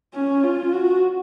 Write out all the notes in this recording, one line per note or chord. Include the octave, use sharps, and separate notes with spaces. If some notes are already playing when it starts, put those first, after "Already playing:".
C#4
F4
F#4